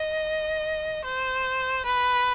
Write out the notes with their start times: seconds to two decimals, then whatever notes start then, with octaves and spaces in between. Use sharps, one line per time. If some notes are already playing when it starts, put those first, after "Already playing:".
Already playing: D#5
1.05 C5
1.86 B4